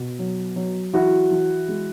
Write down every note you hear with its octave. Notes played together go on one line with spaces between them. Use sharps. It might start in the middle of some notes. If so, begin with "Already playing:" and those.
Already playing: B2
F#3
F#3
E3 E4 F#4
E3
G#3